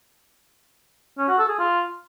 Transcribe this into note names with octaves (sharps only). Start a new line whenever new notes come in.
C#4
F#4
A4
G#4
F4